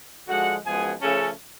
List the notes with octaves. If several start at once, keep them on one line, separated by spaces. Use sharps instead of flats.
D3 F3 G#3 F#4 F#5
F#2 F3 G#3 B3 G#4 G#5
C#3 F3 A3 C#4 A4 A5